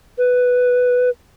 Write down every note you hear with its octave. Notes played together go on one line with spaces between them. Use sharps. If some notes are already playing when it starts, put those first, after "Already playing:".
B4